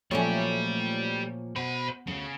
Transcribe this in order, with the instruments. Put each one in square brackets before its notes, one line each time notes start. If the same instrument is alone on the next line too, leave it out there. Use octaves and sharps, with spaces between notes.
[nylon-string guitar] A#2 F3 [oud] F#3 A3 C#4 [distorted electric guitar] G4 D5
[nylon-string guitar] B2 [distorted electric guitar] C5 B5
[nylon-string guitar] D2 G2 [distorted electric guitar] C#3